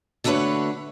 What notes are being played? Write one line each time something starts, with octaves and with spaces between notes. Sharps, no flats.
D3 A3 E4 F#4 B4 C#5